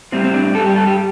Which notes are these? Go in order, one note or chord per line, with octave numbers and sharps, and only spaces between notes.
A2 G3 C4
C4
D4
G2 G3 A4
G4
A4
G4